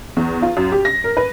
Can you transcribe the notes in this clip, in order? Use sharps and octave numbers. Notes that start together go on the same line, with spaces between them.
E2
F4
F#2
G4
A#6
A#4
B4